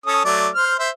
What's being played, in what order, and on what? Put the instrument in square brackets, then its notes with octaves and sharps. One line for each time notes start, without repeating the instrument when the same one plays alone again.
[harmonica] C#4 A4 D#6
F#3 A3 D5
C5 F6
C5 E5